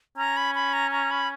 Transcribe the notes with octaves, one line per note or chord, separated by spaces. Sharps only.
C#4 A#5
B5
B5
A#5
A#5
B5